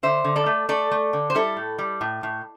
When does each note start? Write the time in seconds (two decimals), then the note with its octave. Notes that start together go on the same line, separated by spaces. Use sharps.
0.03 D3 C5 E5
0.24 D3
0.36 A4 D5
0.46 A3
0.69 A3 A4 D5
0.91 A3
1.13 D3
1.30 C5
1.35 G3 E4 A4
1.57 A2
1.79 G3
2.01 A2
2.23 A2